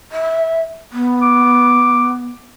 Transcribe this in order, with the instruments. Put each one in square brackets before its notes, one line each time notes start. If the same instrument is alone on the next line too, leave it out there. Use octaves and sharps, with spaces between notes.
[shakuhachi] E5
B3
[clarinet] D6